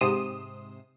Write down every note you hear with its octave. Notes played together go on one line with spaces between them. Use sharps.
G#2 C3 C6 D#6 E7